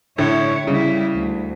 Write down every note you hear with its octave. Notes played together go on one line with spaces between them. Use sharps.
A2 D3 E4 C#5
C#3 G3 E4
D2